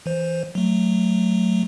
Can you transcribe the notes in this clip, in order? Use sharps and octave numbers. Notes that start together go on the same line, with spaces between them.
E3 C5
F#3 A3